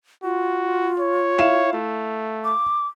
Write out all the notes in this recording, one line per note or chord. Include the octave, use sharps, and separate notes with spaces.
F4 F#4
C#5
E4 F5 E7
A3
D6